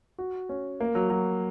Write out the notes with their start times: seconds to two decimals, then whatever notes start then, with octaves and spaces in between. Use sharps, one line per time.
0.19 F#4
0.49 C#4
0.80 A#3
0.95 F#3
1.10 F#3